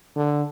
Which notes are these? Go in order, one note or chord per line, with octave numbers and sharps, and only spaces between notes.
D3